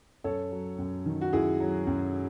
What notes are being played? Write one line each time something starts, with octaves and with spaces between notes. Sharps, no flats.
F#2 A4 C#5
F#3
F#2
D#3
F#4
F#2 E4 G#4
F#3
F#2